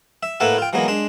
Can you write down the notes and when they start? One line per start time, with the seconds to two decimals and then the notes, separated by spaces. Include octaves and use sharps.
0.23 E5
0.40 A2 A#3 E4 A4 B4 F#5
0.58 F4 G5
0.73 E3 F#3 G#3 A#3 B3
0.88 G#3 D4 C6